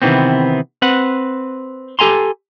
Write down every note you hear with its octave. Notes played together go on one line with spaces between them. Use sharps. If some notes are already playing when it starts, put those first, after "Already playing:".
C3 D#3 E3 B3 C4
C4 B4 F#5
G4 A4 G#5 A#5 C6